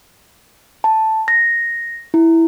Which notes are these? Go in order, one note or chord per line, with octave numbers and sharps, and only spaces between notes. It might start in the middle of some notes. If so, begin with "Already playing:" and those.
A5
A#6
E4